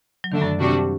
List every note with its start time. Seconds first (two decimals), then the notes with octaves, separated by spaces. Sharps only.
0.24 F#3
0.32 D3 D#3 A3 D4
0.42 F#2
0.60 C3 G3 D4 F#4